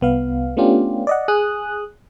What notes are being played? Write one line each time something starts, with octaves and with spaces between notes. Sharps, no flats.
C2 B3 F5
A3 B3 C#4 D4 F4 G4
D5 D#5 F#5
G#4 D#6 F#6